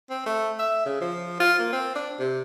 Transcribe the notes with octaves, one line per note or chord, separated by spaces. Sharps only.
C4
A3
E5
C#3
F3
F4
A#3
C4
D4
C3